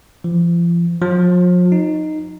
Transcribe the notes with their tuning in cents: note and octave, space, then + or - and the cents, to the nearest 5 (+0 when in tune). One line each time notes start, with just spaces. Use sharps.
F3 -35
F3 +40
D#4 -5